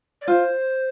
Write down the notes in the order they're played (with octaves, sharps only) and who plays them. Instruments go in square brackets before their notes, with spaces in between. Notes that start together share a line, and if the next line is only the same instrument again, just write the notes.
[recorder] D5
[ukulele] F4 [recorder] C5